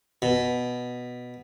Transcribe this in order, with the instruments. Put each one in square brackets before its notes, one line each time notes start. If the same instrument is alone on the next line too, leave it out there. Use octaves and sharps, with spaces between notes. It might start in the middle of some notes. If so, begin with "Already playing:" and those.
[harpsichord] B2